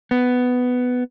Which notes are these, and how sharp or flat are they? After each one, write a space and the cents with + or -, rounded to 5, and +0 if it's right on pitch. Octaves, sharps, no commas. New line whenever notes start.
B3 +10